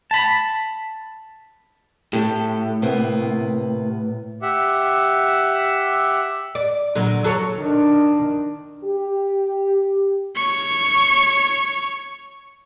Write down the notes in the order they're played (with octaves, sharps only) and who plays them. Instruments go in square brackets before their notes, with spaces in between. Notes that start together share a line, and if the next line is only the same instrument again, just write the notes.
[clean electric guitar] A5 B5
[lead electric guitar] A2 [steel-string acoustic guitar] G4 A4
[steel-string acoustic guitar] C3 A#3 B3
[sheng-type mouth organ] G4 E5 F#5
[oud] D5
A#2 D3 F#3
F#3 A4 C#5
[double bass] D#3 D4
[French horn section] G4
[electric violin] C#5 C#6